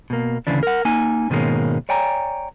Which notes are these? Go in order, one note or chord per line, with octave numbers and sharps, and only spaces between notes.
B2 A#3
D2 C#3 E3 D4
A#4 F#5
A#3 D#4 G#5
G#2 B2 D#3 G#3 A#3 C#4
C#5 D5 G5 G#5 A#5